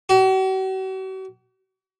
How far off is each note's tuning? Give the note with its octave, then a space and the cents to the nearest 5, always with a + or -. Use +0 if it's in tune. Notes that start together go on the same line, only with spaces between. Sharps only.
F#4 +45